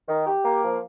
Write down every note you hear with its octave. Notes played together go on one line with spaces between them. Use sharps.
D#3
G4
A#3
F3